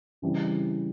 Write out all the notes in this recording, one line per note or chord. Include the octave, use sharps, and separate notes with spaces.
C#3 E3 G3 C4 G4